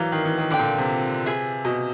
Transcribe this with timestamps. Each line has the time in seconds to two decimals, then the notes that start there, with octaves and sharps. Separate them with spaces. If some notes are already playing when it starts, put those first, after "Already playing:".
Already playing: E3 F#3 A#4 D5 F5
0.12 D#3
0.25 E3
0.38 D#3
0.50 D3 B4 D5 G5
0.59 A#2
0.78 C3
1.26 G#4 B4 E5 G#5
1.65 B2